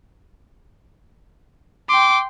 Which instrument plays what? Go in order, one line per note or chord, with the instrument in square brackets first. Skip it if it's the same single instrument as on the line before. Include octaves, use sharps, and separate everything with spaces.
[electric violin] G5 C6 [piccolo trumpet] D6